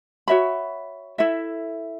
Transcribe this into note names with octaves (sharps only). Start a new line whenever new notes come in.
F#4 C#5 E5 B5
E4 A4 E5